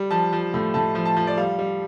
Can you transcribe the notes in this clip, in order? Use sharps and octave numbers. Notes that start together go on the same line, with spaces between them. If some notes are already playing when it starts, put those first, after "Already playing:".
Already playing: G3
F3 A5
F3
A2
A2 A5
F3
A5
F3
D5
G3 F5
G3